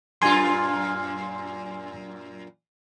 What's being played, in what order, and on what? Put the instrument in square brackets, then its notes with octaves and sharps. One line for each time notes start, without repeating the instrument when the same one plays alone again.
[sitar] F#2 A#2 F4 [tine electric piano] G#5 C6